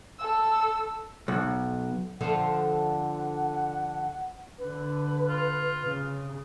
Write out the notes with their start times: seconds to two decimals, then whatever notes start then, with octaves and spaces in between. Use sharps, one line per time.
0.19 A4 E6
1.28 B1
2.21 D3 F3 A4 F#5
4.59 D3 B4
5.28 F4
5.83 C#3